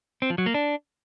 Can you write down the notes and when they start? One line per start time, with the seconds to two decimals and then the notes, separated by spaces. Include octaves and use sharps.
0.22 C4
0.30 F3
0.38 F#3
0.46 A#3
0.54 D4